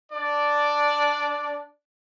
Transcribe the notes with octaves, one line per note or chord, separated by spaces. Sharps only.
D4 D5